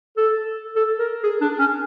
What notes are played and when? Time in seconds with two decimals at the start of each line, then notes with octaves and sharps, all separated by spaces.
0.17 A4
0.76 A4
0.99 A#4
1.23 G#4
1.41 D4
1.59 C#4